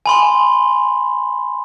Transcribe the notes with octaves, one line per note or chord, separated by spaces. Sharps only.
G#5 B5 C6